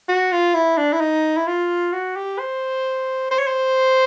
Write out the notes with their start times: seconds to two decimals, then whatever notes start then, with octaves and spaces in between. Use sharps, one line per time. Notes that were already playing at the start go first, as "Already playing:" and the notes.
0.08 F#4
0.32 F4
0.54 E4
0.77 D4
0.93 E4
1.00 D#4
1.37 E4
1.47 F4
1.93 F#4
2.16 G4
2.39 C5
3.31 C5
3.39 C#5
3.47 C5